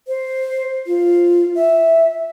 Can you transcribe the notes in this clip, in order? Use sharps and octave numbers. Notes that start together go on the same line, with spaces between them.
C5
F4
E5